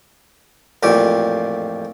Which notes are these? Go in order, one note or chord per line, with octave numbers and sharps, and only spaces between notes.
A1 F2 A#2 G4